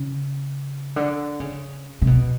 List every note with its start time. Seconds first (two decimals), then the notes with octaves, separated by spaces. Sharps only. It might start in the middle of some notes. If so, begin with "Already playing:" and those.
Already playing: C#3
0.96 D3
1.40 C#3
2.02 C3
2.07 B2